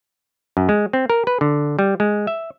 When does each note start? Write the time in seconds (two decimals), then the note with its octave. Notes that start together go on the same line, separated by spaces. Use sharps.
0.57 F#2
0.69 G#3
0.93 C4
1.10 A#4
1.27 B4
1.41 D3
1.79 G3
2.00 G#3
2.27 E5